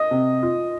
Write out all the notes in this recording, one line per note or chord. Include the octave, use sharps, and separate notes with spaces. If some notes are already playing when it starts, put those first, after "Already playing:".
Already playing: D#5 D#6
C3
F4